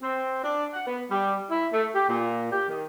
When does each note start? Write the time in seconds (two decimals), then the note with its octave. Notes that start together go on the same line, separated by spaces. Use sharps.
0.02 C4
0.44 D4
0.74 F#5
0.86 B3
1.11 G3
1.51 E4
1.72 A3
1.94 G4
2.08 A#2
2.51 G4
2.68 D#3